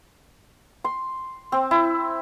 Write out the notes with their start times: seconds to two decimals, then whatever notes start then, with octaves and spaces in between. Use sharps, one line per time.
0.84 C6
1.52 C4
1.71 E4